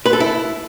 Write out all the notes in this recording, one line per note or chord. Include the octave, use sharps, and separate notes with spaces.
B4
A4
E4